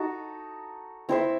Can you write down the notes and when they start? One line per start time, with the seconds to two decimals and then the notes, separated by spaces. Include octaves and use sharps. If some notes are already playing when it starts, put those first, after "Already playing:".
Already playing: D#4 F#4 A4
1.09 C4 E4 C5 E5